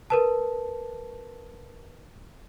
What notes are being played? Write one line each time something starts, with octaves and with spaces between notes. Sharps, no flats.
A#4 B4 A5